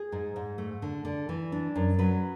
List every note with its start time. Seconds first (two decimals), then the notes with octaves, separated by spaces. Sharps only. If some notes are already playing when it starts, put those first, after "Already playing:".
Already playing: G#4
0.12 G#2
0.36 G#2
0.58 A3
0.82 D3
1.05 D3
1.29 E3
1.52 D4
1.76 F#2
1.99 F#3 B4